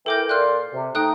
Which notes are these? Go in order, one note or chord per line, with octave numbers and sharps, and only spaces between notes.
E3 A4 A#4 G5 D6 G6
A#2 D5 C6 F6 F#6
C3
A3 D#4 G5 D#6 F#6